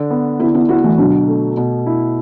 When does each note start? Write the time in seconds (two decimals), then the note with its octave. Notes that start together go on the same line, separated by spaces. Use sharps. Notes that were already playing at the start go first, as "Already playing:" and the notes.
Already playing: D3
0.10 B3
0.40 D3 B3 E4
0.54 B3 E4
0.69 B3 E4 F#4
0.84 E3 A3
0.98 B2 D3 F#3
1.27 A3
1.57 B2
1.86 E4